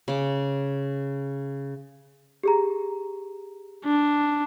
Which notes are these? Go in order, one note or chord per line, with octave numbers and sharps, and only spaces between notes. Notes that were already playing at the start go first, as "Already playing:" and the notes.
C#3 D6
G4 G#4 A#5
D4